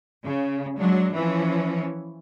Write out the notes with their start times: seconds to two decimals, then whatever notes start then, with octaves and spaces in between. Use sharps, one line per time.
0.23 C#3
0.78 F#3 G#3 D4
1.14 E3 F3 C#4